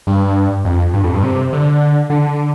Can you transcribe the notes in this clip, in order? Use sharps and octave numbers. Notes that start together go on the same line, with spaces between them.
G2
F2
G2
F2
G2
C3
D3
D3